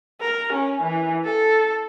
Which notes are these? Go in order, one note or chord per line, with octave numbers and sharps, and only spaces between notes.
A#4
C#4
E3
A4